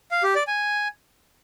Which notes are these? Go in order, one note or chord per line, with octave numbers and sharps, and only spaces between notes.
F5
G4
D5
G#5